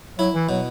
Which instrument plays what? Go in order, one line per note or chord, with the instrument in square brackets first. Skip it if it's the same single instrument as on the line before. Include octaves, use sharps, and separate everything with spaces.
[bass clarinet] F#3 [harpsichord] E4
[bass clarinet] E3
[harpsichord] B2 [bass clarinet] F#3